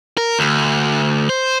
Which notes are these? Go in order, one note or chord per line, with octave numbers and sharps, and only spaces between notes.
A#4
D2
C5